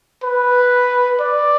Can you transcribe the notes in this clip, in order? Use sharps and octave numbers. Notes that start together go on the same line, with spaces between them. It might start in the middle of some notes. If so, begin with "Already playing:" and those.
B4
D5